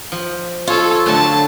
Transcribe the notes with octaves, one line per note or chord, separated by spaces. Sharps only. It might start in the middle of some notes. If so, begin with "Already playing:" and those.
F3
F4 A4 C#5
D3 F#3 A3 A5